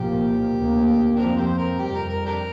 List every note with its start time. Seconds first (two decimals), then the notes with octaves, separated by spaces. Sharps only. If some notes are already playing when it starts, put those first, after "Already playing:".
Already playing: C2 A#2 F3 A#3 G4
0.53 D2 C3 A#3
1.16 F2 F3 C4 D4 G4 A#4
1.36 G4 C5
1.58 A#4
1.78 F2 C3 G3 G4
1.94 A#4
2.09 A#4
2.26 D4 G4 A#4